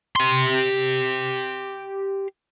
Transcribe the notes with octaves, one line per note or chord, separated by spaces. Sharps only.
G4 C6